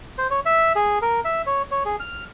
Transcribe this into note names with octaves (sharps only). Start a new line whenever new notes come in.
C5
C#5
E5
G#4
A#4
E5
C#5
C#5
G#4
F6